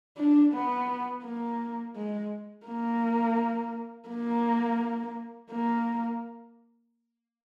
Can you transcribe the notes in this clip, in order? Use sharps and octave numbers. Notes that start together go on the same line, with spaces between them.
D4
B3
A#3
G#3
A#3
A#3
A#3